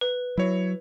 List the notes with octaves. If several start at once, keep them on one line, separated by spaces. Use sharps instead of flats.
B4
F#3 E4 C#5